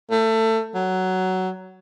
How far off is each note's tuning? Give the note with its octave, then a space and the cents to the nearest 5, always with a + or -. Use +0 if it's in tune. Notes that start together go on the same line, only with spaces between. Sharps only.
A3 +25
F#3 +10